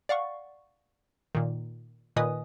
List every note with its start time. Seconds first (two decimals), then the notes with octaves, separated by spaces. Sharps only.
0.09 D5 F5 F#5 C#6
1.35 A#2 D#3
2.16 A#2 D#3 B4 D#5 G#5 D#6